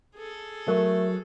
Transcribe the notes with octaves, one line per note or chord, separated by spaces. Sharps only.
G#4 A4
F#3 A3 A#4